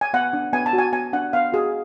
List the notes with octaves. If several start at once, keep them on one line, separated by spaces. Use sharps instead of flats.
G#5
B3 F#5
D4
B3 G#5
A5
F#4
G#5
B3 G#5
D4 F#5
B3 F5
F#4 G#4